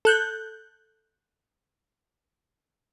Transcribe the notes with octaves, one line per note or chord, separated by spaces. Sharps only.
A4 F#6 G6